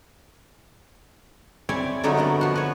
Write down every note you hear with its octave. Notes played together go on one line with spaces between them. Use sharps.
C4 E4 C#5 D5 G#5
D3 F#3 G3 A3 D#4
B3 A#4 F#5
F3 F#4
B4 C#5